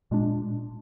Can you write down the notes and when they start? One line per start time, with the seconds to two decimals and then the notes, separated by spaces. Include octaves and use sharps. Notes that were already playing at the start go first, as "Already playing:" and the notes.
0.11 A#2 G#3 D4